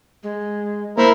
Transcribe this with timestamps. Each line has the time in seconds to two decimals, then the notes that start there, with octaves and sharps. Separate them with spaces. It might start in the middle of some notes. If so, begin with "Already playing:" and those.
0.23 G#3
0.98 A#3 E4 A#4 C5